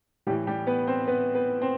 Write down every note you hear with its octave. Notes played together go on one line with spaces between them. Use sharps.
A2 E3 G3 G4
G3 G4
B3 B4
C4 C5
B3 B4
B3 B4
C4 C5